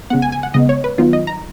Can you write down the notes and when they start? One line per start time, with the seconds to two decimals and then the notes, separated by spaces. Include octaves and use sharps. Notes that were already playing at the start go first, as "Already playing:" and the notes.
0.10 C#3 G#3 B3 F#5
0.22 G#5
0.32 G#5
0.43 F#5
0.54 C#3 G#3 B3 D#5
0.69 C#5
0.84 B4
0.98 D#3 F#3 B3 D#4 F4
1.13 D#5
1.27 A#5